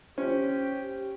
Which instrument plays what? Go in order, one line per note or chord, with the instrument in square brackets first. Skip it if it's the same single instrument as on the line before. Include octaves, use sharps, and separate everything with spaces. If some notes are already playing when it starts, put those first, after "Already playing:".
[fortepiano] C#4 [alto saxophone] G4 [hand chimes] C5